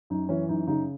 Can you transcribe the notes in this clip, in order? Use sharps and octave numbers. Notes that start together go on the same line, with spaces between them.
F#2 D#4
E3 C#4
F#2 D#4
C#3 D#4